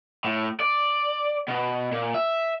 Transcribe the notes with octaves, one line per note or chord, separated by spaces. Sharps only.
A2
D5
B2
A#2
E5